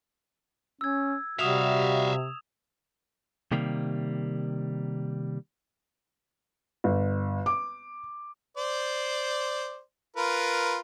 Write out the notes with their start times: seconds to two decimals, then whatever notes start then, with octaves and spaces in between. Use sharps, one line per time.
0.81 C#4 E6 G#6
1.39 C3 G3 F#4 E5 F5 D#6 E7 F7
3.52 C3 D#3 G3 A#3
6.84 G1
7.46 D6
8.57 C5 D5
10.17 F4 A#4 B4